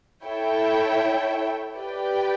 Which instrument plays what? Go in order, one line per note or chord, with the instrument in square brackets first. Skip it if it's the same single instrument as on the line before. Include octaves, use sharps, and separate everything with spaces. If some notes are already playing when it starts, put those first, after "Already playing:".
[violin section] E4 A4 C#5 E5 G5
G4 B4 D5 G5